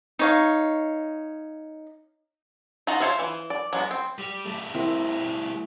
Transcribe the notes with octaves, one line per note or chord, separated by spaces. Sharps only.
D#4 C#5 F5
D#4 F4 F#4 A#5
F4 C5 C#5 E5 F5
E3
D5
F#3 G#3 B3
C4
G3
G3 A3
C4 E4 A#4